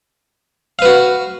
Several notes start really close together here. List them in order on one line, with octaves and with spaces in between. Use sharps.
F5 B4 F#4